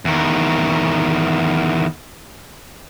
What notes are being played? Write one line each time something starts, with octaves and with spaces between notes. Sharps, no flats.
E2 D#3